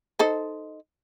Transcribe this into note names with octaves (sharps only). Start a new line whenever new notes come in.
D#4 A4 C5